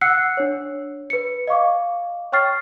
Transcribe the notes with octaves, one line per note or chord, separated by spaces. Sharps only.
F#5 E6 F#6 C7 C#7
D4 C#5
B4 C#7
D#5 F5 C#6 D6
C#5 G5 C#6 F6 A6 C7